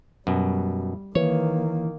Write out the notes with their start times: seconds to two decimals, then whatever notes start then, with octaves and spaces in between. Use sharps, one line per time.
0.27 F#2 B2 G3
1.15 D#3 E3 A#3 C#5